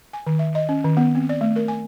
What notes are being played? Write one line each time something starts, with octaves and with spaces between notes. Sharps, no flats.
G#5
D#3
E5
D#5
C#4
D#3
B3
C4
D5
A3
A#4
G#5